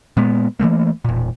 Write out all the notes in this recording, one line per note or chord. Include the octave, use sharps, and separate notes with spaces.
A#2 G#3 B3
E3 F3 A3 A#3
E1 A#2